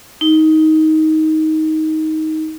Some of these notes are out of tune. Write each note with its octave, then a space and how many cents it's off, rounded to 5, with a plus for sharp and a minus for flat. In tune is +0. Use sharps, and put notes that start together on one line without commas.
D#4 +15